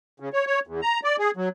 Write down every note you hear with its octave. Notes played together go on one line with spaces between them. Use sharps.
C#3
C#5
C#5
E2
A#5
D5
G#4
F#3